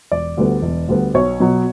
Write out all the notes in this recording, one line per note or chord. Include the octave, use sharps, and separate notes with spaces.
E1 D5
D2 D3 G3 B3
E1
D2 D3 G3 B3
B1 C#5
B2 F#3